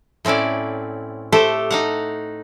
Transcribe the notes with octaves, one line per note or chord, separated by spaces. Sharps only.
A2 C4 C#4 E4 D5
A3 G4 A4 C5
D#4 F5 F#5